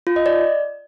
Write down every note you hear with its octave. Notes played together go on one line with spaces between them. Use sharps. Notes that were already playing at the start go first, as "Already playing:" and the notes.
F4
D#5
D5